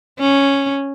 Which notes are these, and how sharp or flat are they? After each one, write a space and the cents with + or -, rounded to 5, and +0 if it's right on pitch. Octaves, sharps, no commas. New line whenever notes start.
C#4 -5